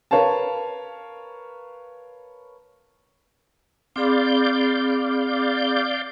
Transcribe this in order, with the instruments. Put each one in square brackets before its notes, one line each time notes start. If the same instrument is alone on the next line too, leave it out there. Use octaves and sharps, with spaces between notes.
[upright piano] A#4 B4 C#5 F5 A5
[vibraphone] C4 G#4 B5 [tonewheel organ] D5 F5 G6